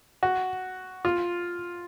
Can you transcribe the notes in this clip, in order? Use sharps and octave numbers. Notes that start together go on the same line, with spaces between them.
F#4
F4